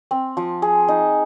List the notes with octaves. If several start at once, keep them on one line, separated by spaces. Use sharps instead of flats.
C4
F3
G#4
D#4